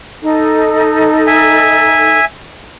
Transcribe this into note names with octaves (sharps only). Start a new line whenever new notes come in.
D#4 A4
E5 G#5